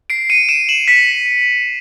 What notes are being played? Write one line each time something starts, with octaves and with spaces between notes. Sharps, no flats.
C7 D7
C#7 D#7
D7 E7
E7 F#7
B6 C#7